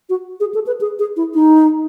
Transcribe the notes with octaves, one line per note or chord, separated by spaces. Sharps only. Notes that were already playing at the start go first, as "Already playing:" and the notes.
F#4
G#4
A4
B4
G#4
G#4
E4
D#4